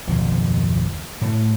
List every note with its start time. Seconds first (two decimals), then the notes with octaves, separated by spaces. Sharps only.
0.08 F#1 D#2 B2 F3
1.21 A2 A3